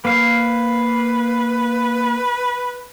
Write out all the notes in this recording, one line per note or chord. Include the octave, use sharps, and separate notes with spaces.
A#3 B4 F5